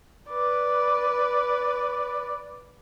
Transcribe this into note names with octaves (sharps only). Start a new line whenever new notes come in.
B4 D5